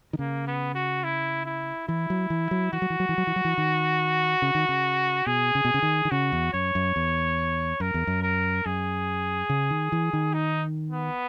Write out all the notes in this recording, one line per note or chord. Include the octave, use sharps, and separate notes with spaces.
D#3
C#3 A#3
B3
F#4
E4
E4
E3 E4
F#3
E3
F#3
E3 F#4
F#3
E3
F#3
E3
F#3
E3
F#3
E3
D#3
C#3
D#3
C#3
B2 G#4
C#3
B2
C#3
D#3
D#3
C#3 F#4
E2
F#2 C#5
F#2
E2
F#2 A#4
E2
F#2
A#4
F#2 G#4
C#3
D#3
E3
D#3
D#4
B3